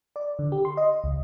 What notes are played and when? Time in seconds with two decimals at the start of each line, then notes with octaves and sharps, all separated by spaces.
0.16 D5
0.39 D3
0.52 G4
0.65 C6
0.77 D#5
1.04 C#2